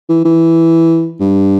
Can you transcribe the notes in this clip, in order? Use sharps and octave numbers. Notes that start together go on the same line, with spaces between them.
E3
E3
G2